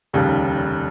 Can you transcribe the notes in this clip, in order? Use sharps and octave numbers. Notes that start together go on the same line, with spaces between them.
F1 D#2 C#3 G3